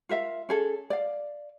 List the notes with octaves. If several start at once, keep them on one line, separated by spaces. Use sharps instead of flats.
F4 A#4 E5 F5
C#4 G#4 A4
D5 F5